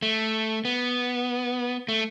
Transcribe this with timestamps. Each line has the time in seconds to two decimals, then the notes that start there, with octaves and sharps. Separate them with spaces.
0.02 A3
0.65 B3
1.88 A3